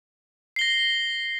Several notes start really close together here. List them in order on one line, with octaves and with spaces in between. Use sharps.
C7 G7 A#6